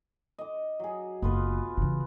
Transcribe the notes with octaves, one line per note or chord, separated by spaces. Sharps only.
D#5 D6
F#3 G#4
F#1 B3 F4 B4
C#3 E3